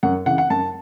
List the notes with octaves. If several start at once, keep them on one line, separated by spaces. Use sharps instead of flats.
F#2 F#5
C#3 E3 F#5
F#5
F#2 A5